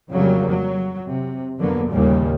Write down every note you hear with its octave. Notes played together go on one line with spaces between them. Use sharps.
F2 C#3 F#3 G3 A#3
F#3
C3
F2 D3 F#3 A#3 B3
A1 D#2 A#2 C#3 G3